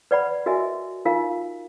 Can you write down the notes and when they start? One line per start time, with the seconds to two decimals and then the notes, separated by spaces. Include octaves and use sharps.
0.11 B4 D5 F#5 B5
0.46 F#4 A#4 D#5 E5 G#5
1.05 D#4 F4 A#4 F5